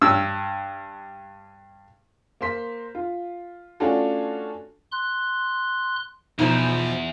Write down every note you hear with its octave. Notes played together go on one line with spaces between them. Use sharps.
G2 E6
A#3 C5 C6 B6
F4
A3 C#4 D4 F4 F#4 A4
C6 F#6
E2 B2 F3 D#4 E4 C5